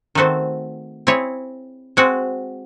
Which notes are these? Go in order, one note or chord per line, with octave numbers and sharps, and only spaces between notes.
D#3 A3 C4 F#4 C5
C4 E4 G#4 C#5
G#3 C4 F#4